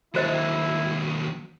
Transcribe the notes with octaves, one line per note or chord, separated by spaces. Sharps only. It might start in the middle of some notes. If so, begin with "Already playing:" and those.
D#2 F#3 E4 F#4 C5 D#5